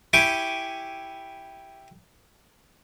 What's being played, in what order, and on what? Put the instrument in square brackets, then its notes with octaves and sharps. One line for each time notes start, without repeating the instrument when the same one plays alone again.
[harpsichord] E4 G4 G5 G#5 C#6 D6